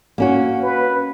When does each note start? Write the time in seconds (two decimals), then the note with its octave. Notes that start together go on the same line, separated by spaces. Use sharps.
0.18 A#3 C#4 F#4
0.63 B4